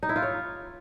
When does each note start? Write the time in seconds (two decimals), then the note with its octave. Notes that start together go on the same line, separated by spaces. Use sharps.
0.03 D#4
0.09 E4
0.16 F4
0.22 C#5